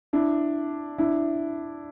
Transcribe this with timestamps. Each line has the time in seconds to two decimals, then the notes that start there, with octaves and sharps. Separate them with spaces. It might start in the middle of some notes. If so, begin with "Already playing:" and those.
0.13 D4 E4
0.98 D4 E4